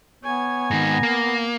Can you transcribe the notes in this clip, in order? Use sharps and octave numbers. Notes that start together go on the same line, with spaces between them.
B3 C#5 G#5
G#2 D#3 A#5
A#3